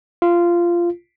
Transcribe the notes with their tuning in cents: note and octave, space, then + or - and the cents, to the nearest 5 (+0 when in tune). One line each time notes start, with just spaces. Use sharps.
F4 -15